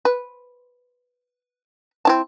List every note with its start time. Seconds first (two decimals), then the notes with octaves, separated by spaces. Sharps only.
0.05 B4
2.05 C4 E4 A5